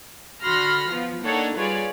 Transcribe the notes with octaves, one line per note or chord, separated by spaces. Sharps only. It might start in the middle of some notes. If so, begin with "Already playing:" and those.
D3 F#4 B5 C6 F6 A#6
F3 B3 F4
A#3 D4 D#4 A4 C#5 F#5
G3 F4 G#4 B4 C#5 D5